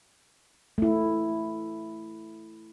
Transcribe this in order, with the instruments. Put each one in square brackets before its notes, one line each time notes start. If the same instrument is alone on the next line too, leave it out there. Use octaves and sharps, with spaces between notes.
[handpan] A3 E4